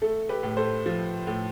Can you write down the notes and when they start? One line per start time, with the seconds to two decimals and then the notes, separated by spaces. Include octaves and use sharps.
0.02 A3 A4
0.29 G4 B4
0.43 A2
0.57 A4 C5
0.86 F3
1.27 A2